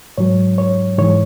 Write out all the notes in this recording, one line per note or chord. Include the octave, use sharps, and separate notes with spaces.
G#2 F#3 C#5
C#5
G#2 E3 C#5